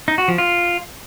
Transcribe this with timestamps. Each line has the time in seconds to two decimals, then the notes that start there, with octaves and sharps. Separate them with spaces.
0.08 D#4
0.18 F#4
0.28 F3
0.38 F4